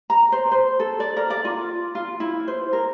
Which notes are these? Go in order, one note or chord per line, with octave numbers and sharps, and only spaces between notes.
A#5
C5
C5
A4
D5
A#4
D5
F4
F4
E4
C5
A#4